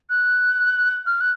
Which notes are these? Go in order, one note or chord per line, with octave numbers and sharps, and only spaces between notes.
F#6
F6
F#6